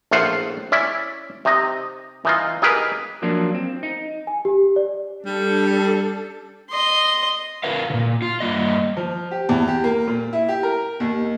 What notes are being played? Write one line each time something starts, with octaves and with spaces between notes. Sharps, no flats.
A#1 A2 F4 C5 F5 F#5
C#4 E4 D5 E5
C3 D#4 D#5
E3 D#4 F4
D#4 G4 G#4 A#4 B4
F3 F#3 A#3 D4
C4
D#4
G#5
G4
D5
G3 D4 A4
D#5 C6
F4 A#4 B4 F5
A#2 C#3
F4
G2 C#3 A#3 D#5
F3
G4
E2
G4
A#3
A#2
E4
G4
A#4
D#2